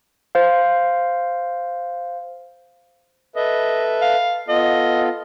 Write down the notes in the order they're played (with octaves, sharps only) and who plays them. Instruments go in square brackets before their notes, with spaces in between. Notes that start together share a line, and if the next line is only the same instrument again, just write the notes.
[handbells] C5 F5
[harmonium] A4 B4 E5 [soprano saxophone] D#5
[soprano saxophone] F5
[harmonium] B3 F4 A4 [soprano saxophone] D#5